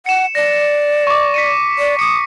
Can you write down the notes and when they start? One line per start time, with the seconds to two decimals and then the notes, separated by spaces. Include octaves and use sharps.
0.06 F#5 C#7 E7
0.35 D5 A#6
1.07 C#6 D6
1.34 B6 C#7 D#7
1.79 D5
1.99 D#6 C#7